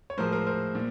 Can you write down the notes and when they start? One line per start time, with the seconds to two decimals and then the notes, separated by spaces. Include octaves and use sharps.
0.10 C#5
0.18 A2 F3 G#3 A#4 C5
0.32 A#4 C5
0.47 A#4 C5
0.75 A#2